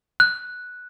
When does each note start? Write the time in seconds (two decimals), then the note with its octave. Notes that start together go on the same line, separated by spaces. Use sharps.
0.20 F#6